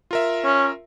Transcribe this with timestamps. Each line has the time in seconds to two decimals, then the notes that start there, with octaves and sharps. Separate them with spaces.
0.11 F4 A#4 E5
0.44 C#4